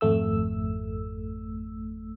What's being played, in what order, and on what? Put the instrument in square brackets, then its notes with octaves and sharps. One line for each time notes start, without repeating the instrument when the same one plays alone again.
[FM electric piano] G#1 F2 A3 E6